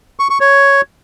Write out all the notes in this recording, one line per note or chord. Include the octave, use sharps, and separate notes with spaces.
C#6
C#6
C#5